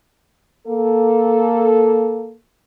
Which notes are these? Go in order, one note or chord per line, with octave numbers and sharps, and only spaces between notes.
A#3 A4